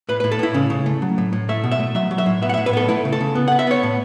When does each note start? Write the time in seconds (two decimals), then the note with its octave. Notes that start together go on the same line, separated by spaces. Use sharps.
0.09 A2 B4
0.20 A2 B4
0.31 A4
0.39 A2 E4
0.54 C#3 C#4
0.70 C#3
0.86 A3
1.02 F#3
1.18 A2
1.33 A2
1.49 A3 E5
1.64 B2
1.72 E5
1.80 A3
1.95 F#3 E5
2.11 F#3
2.18 E5
2.26 A2
2.42 B3 E5
2.49 F#5
2.54 A2 E5
2.66 B4
2.73 B3 A4
2.88 A3 E4
3.05 C#3
3.12 A4
3.20 C#3
3.35 B3
3.48 B3 F#5
3.59 E5
3.67 B3 C#5
3.83 A2